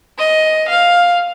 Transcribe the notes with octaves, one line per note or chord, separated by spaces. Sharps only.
D#5
F5